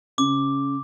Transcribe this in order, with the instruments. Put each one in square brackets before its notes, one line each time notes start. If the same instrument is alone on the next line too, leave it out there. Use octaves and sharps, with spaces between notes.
[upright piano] C#3 [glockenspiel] D6